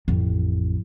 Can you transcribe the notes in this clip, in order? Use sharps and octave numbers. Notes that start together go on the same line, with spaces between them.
A1 F2